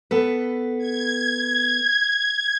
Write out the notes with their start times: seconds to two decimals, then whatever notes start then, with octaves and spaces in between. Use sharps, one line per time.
0.11 B3 A4 B4
0.78 G#6